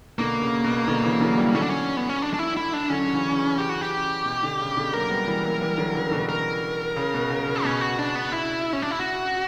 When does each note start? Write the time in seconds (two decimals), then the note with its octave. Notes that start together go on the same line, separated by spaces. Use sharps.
0.19 B2 D3 A#3
0.42 C#3
0.64 B2
0.88 B2 D3
1.03 C#3 E3
1.20 D3 F#3
1.37 E3 G3
1.54 D3 F#3 C#4
1.63 D4
1.70 C#4
1.97 B3
2.09 C#4
2.22 D4
2.33 D4
2.39 E4
2.57 E4
2.73 D4
2.90 D3 F#3 C#4
3.07 D3
3.13 C#3 E3
3.35 C#3
3.58 C#3 G4
3.69 F#4
3.81 G4
4.26 B2
4.43 B2 D3
4.60 C#3
4.77 B2 D3
4.93 F#3 A#3 A#4
5.10 G3 B3
5.27 E3 G3
5.44 F#3 A#3
5.61 E3 G3
5.78 D3 F#3
5.94 C#3 E3
6.12 B2 D3
6.29 A#4
6.96 C#3
7.14 B2
7.30 C#3
7.47 C#3
7.64 B2 C#4
7.81 F#4
7.99 D4
8.15 B3
8.32 E4
8.73 C#4
8.82 D4
8.91 E4
8.99 F#4